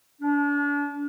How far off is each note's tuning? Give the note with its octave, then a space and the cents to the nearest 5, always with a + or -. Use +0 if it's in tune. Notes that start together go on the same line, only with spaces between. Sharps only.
D4 -35